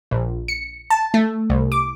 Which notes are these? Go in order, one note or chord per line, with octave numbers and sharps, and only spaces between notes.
A#1
C#7
A5
A3
C2
D6